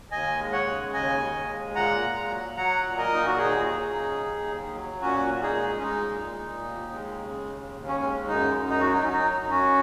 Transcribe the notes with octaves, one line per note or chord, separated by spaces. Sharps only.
D#2 D#5 G#5
G#3
C#5 F#5
C#3
D#2 D#5 G#5
D#2
G#3
A#2 F#5 A#5
A#2
F#3
F#3 F#5 A#5
A#2
A#4 D#5
A#2 D#4
F#4
D#2 D#4 G#4
F#3
C#3
D#2
D#2
F#3
A#2 C#4 F#4
A#2
D#4 G#4
G#3
C#4
G#3 D#4
A#2
A#2
D#2
G#3
C#3
D#2
D#2
C#4
G#3
F#2 D#4
F#2
D#4
F#3 F#4
D#4
C#4
F#3 D#4
F#2
C#4 F#4